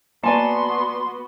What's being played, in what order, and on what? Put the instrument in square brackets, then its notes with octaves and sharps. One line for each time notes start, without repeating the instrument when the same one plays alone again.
[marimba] A#3 [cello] B3 F#4 [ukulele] D5 G#5 A5 [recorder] C6